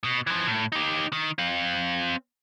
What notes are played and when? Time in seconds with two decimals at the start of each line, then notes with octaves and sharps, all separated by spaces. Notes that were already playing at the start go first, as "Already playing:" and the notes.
0.04 B2
0.27 E3 F3
0.47 A2
0.72 D#4 G4
1.13 D#3
1.38 C4 F5